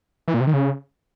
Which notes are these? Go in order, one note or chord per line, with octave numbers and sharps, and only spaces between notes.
E3
A#2
C3
D#3
C#3